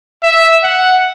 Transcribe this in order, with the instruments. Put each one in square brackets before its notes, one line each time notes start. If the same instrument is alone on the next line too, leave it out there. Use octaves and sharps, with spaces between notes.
[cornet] E5
F#5